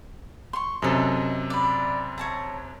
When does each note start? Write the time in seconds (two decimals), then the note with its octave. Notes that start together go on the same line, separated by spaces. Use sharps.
0.53 C6 C#6
0.82 F#2 C3 A4 D#5
1.50 D5 B5
2.18 C#5 A5 A#5